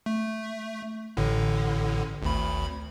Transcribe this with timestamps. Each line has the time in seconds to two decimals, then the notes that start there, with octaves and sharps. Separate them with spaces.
0.06 A3
1.17 A1 A2 D3
2.22 G#1 D2 B5